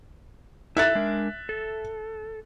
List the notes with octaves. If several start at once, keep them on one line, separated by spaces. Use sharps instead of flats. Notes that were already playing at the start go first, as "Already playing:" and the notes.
E4 A4 E5 F#6 A6
G#3 D4 A#4
A4